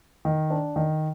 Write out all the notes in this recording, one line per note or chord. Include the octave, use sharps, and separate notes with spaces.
D#3
D4
D#3